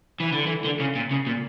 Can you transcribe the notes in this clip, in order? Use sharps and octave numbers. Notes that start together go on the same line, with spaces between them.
E3
D3
E3
D3
C#3
A#2
C#3
A#2